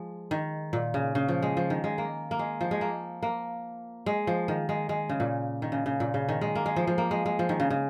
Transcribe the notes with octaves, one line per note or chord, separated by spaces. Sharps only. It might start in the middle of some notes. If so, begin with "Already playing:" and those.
Already playing: F3 G#3
D#3
A#2
C#3
C#3
F3
G#3
F3
D#3
G#3
A#3
A#3
G#3
F3
G#3
A#3
A#3
G#3
F3
D#3
G#3
G#3
C#3
A#2
D#3
C#3
C#3
A#2
C#3
D#3
G#3
A#3
G#3
F3
F3
A#3
G#3
G#3
F3
D#3
C#3
C#3